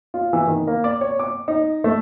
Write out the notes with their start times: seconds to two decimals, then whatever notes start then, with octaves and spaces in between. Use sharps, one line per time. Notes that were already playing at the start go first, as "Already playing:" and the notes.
0.14 F4
0.33 E3
0.47 D#3
0.67 A#3
0.84 D5
1.01 C#5
1.19 D6
1.48 D#4
1.84 A3